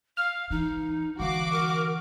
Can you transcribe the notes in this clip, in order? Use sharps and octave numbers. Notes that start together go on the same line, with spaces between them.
F5 F6
E3 D#4
D3 E3 F#4 F5 D6
A#4